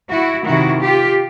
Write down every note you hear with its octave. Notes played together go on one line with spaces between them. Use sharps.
E4 F#4
C3 D#3 E4 F#4
F4 G4